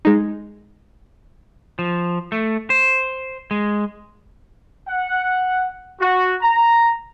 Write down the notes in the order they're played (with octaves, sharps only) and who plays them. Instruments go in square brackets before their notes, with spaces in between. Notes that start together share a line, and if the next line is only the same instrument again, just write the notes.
[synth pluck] G#3 D#4
[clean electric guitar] F3
A3
C5
G#3
[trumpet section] F#5
F#4
A#5